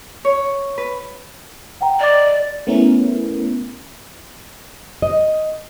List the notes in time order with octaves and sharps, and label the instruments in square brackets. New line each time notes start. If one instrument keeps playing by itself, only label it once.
[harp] C#5
B4
[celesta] F#5 G5 A#5
[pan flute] D5 [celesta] D#5 D6
[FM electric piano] A3 B3 C#4 E4 A#4
[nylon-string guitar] D#5